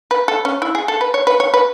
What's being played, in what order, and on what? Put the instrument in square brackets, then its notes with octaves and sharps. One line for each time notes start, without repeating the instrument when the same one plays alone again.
[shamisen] B4
A4
C#4
E4
G#4
A4
B4
C#5
B4
C#5
B4